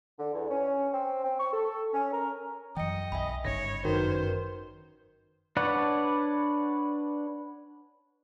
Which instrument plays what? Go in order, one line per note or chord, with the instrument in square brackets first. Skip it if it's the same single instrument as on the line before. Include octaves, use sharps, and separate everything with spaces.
[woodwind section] D3
E2
C#4
C4
C4
C#6
A4
C#4
A#4
[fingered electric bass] F#2 E3 [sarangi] D#5 [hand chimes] G5 C#7
[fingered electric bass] B1 [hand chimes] E5 G#5 B5
[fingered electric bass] G1 G#2 C#3 [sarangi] C#5 [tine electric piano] A#6
[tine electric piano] F#2 D#3 [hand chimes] F#4 B4 [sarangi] C5
[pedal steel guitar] D4 B4 C#5 D5 F#5